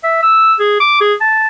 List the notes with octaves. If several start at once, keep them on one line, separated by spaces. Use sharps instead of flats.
E5
E6
G#4
D6
G#4
A5